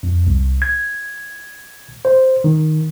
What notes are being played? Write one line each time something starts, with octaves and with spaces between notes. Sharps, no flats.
F2
C2
G#6
C5
D#3